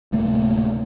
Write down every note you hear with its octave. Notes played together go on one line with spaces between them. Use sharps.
D1 C3 A3 A#3